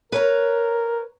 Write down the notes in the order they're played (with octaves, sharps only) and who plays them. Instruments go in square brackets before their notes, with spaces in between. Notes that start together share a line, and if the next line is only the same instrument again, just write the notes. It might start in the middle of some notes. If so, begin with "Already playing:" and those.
[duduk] A#4 [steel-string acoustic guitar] B4 C#5 A#5